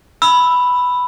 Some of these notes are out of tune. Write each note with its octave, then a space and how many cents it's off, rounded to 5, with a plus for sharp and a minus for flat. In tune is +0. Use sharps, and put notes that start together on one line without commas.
B5 +0 E6 +0